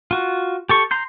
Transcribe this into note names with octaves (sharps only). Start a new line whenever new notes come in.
F4 F#4
G4 A4 C#6
A#5 C6 G6